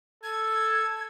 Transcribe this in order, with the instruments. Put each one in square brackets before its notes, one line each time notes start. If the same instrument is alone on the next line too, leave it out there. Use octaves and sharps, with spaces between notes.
[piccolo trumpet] A4 [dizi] G#6